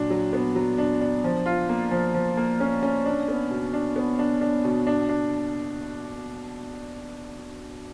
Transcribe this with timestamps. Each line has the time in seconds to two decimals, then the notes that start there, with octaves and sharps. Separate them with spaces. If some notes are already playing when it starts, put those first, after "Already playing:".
Already playing: A#2 F#3 D4
0.10 F#3
0.33 B3
0.55 F#3
0.78 D4
1.01 D4
1.24 F3
1.46 F4
1.69 A#3
1.91 F3
2.14 F3
2.37 A#3
2.60 C#4
2.83 C#4
3.06 D4
3.28 B3
3.51 B2
3.73 D4
3.96 B3
4.19 D4
4.41 D4
4.64 B2
4.87 D4
5.09 D4